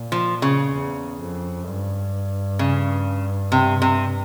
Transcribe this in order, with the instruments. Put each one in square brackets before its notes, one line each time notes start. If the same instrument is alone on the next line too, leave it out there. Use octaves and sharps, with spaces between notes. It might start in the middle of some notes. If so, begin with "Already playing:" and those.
Already playing: [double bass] A#2
[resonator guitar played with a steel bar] F3
C#3
[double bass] E2
F2
G2
[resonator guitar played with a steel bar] C#3
C3
C3